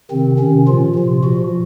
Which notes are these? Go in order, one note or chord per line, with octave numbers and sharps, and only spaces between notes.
C3 D#3 C4
C3 D#3 C#4
A#2 F3 F4
C3 F3
A#2 F3 F#4